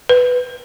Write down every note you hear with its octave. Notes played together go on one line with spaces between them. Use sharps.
B4